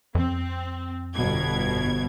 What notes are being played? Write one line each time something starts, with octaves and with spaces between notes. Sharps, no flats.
F2 C4
G1 B2 G#6